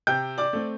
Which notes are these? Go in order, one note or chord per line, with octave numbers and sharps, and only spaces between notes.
C3 G5 G6
D5 D6
A3 C4